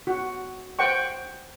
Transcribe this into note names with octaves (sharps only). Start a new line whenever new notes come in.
F#4
C5 F#5 G5 C#6